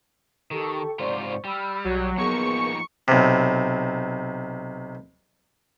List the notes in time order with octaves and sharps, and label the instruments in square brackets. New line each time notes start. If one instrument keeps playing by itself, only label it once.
[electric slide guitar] D#3 [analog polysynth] G4 A4 C#6
[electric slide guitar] G#2 C3 F4 [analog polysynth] C5 D5 C#6
[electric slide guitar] G3 [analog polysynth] B5 E6 F6
[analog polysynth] B1 [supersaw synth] F#3
[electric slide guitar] F3 A#3 D#4 [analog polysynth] B3 G#4 A#4 [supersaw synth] C#6 C#7
[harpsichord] B1 C3